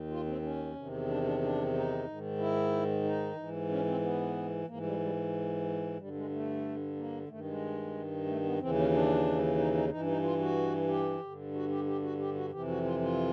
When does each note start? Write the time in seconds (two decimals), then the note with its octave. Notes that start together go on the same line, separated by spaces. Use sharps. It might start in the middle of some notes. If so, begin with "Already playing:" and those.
Already playing: D#2 D#3
0.10 F4
0.26 C4
0.42 C#4
0.75 E2 C3 D#3
1.08 D4
1.24 D4
1.40 D4
1.73 D#4
2.05 G#2 D#3
2.38 E4
3.04 D#4
3.36 G#2 E3
3.69 C#4
3.86 C4
4.02 B3
4.67 G#2 E3 A#3
4.83 G3
5.00 G3
5.98 G2 D3 G3
6.14 G#3
6.30 A3
6.96 A#3
7.28 G2 D#3 A3
7.45 G#3
8.26 A3
8.43 B3
8.59 D#2 C#3 E3 C4
8.76 C#4
8.92 D4
9.58 D#4
9.73 D#4
9.90 G2 E3 D#4
10.01 D4
10.07 D#4
10.22 F4
10.39 F#4
10.88 G4
11.21 G2 D3
11.54 F#4
11.69 G4
11.86 G4
12.02 F#4
12.19 G4
12.35 F#4
12.51 F2 C3 E3 G4
12.67 F#4
12.84 F4
13.01 F4